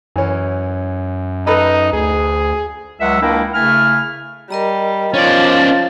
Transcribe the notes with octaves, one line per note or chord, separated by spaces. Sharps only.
F#2 E3 C#4
D#4 A4 B4 D#5
D2 G#4
C#2 F#3 E5 F#5 E6
C#2 A#3 D4 E4 A#4 G5
C#3 A3 E4 G#5 F6
G3 A#4 D#5 A#5
F3 C#4 D5 A6